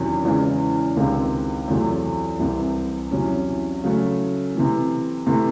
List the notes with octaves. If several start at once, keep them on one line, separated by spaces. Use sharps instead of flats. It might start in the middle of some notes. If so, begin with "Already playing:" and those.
Already playing: E2 C3 D#3 F#3 C#4
E2 C#3 E3 G#3
C#2 C3 D#3 G#3 C4
E2 C3 F#3 A3 C4
C2 C3 E3 C4
E2 C3 F#3 C#4
C#3 F#3 A3
C3 E3 A3
C3 E3 A3